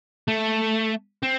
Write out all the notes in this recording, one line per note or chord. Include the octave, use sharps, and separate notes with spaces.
A3
C4